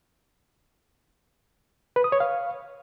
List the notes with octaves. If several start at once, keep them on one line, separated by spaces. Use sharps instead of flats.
B4
D#6
C#5
F5